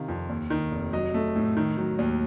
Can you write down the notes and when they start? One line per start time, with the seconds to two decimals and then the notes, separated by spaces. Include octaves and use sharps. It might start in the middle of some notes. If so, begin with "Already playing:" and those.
Already playing: C3 D#3 F5
0.08 F2
0.29 D#2
0.50 D#3
0.72 F1
0.93 F#3 D#5
1.14 A3
1.36 A2
1.57 D#3
1.77 F#3
1.99 D#2